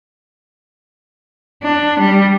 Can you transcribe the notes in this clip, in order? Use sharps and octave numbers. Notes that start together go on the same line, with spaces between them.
D4
G3